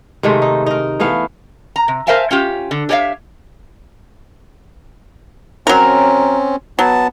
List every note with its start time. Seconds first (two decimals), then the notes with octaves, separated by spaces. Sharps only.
0.23 C3 D#3 G#3 A3
0.42 D#4
0.66 D#4 A#4
1.00 E3 A3 B3 F5
1.76 A#5
1.88 C3
2.07 A#4 C5 E5 F5 G#5 A5
2.31 C#4 F4 G4
2.71 D3
2.89 G4 G#4 C#5 D5 E5 F5
5.67 F#3 C4 C#4 A#4
6.79 F#3 B3 A5